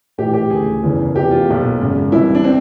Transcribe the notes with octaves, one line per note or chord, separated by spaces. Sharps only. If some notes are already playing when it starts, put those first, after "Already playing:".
A#1 A2 E3 G4
G4
D2 C#3 E3 G#4
F#1 E2 C#3 E3
F1 E2 C#3 E3 G4
F4
B1 A#2
G#1 F#2 C#3
C2 C3 E3 E4
D4
C4